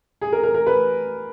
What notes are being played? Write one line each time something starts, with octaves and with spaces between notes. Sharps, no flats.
G#4
A#4
A#4
A#4
B4